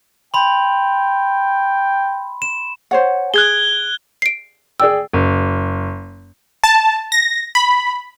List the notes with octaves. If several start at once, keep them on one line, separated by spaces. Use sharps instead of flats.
G5 B5 C6
E7
C5 C#5 F#5
G#4 F#6 G#6 G7
C7 D7
G#4 D5 G5 E6
F#1
A5
A#6
B5